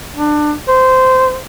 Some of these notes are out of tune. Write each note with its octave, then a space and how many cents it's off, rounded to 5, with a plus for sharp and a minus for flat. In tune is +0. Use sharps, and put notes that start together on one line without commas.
D4 +25
C5 -15